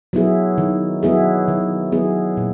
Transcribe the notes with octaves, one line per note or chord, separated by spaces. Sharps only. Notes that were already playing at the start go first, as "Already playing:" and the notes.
F#3 B3 E4 G#4
D#3
F#3 B3 E4 G#4
D#3
F#3 B3 E4 G#4
A#2